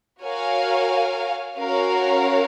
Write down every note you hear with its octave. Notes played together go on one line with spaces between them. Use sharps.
F#4 A#4 C#5 F5 G#5
C#4 F#4 A#4 C#5 F5